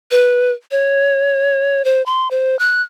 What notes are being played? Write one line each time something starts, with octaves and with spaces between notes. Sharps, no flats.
B4
C#5
C5
C6
C5
F#6